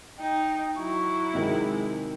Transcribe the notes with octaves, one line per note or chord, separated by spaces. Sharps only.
D#4 G5
F#3 E4 C#6
C3 D#3 G#3